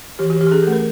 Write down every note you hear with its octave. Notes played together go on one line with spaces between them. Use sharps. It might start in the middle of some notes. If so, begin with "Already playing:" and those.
E3 G4
F#4
E3 G4
G4
C#4 G#4
A4
A3
A#4